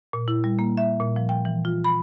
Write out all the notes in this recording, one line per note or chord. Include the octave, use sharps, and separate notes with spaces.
A#2
E4
G3
A#3
E5
A#2
F3
G5
E3
F4
B5